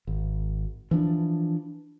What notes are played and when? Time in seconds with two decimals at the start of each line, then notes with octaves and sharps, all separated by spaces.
0.07 G#1
0.91 E3 F3 D4